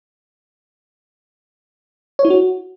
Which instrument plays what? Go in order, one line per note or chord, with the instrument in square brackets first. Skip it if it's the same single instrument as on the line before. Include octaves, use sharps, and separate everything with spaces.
[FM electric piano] C#5
E4
F#4